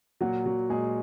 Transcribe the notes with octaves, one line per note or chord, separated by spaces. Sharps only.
A#2 F#3 F#4
F#3
A#2 G#3 G#4